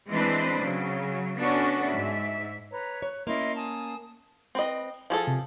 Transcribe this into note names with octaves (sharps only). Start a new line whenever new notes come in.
E3 G#3 C4 D4 B4 C5
C#3 F#3
B3 C#4 D4 F#4 A4
G#2 E5
B4 C#5 A#5
C#5 F#6
A#3 C#4 E4 D#5 C6
G#5 A5 D#6
C4 B4 D#5
F3 G#4 A4
C3